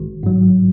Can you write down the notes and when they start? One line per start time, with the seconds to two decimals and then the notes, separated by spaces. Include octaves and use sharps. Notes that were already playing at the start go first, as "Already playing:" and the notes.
Already playing: G#1
0.23 G#2 F#3